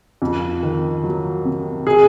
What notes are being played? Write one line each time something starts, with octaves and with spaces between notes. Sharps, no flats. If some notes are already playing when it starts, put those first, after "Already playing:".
F2
D#3
F#3
C3
G#4